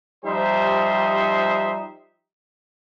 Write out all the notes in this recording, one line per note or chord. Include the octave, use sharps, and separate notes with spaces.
F3 G3 D#4 G4 C5 E5